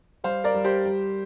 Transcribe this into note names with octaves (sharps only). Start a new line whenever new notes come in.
G3 C5 F5
A#4 D5
G3
G4 C5
G3